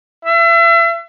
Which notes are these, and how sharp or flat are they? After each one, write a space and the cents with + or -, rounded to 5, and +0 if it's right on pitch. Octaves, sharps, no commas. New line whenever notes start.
E5 +35